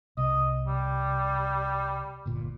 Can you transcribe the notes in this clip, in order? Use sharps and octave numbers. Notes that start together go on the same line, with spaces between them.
C2 D#5
G3
G1 A#2